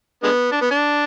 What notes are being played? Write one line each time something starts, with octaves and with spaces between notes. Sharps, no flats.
D3 G#3 B3
D4
B3
D4